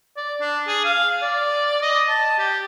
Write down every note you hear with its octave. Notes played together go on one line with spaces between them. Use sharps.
D5
D4
G#4
F5
D5
D#5
A5
G4